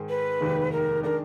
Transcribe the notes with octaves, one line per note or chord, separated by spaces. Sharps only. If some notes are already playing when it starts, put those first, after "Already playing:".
Already playing: G#2 D#3 G#3
B4
F1 D#2 D#3 G#3
A#4
D#3 G#3 D4 A#4